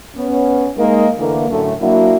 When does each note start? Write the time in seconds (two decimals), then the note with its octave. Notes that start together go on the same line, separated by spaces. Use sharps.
0.17 B3 C#4
0.77 G#3 A#3 D#4 A#4 D#5
1.18 D3 E3 A3 A#3
1.49 F#2 A2 D3 A3
1.80 F#3 A#3 D4 E4 F#4